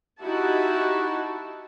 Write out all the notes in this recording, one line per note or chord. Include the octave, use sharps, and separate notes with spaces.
D#4 E4 F#4 G4 A5